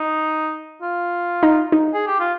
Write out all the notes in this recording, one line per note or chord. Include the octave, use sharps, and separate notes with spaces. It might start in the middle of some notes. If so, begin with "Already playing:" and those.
Already playing: D#4
F4
D#4
D#4
G#4
G4
F4